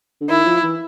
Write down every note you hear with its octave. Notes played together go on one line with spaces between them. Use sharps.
D3
D#3 E4
F3
E3